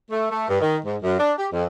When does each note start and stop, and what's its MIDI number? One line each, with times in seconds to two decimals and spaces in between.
0.11 0.29 57
0.30 0.48 57
0.49 0.59 43
0.61 0.77 51
0.84 0.96 44
1.02 1.18 42
1.19 1.32 62
1.37 1.47 67
1.52 1.65 41